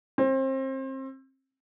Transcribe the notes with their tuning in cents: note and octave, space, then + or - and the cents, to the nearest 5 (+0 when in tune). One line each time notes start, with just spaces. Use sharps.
C4 +30